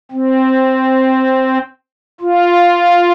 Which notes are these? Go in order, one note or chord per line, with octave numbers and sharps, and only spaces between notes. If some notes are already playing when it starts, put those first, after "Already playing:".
C4
F4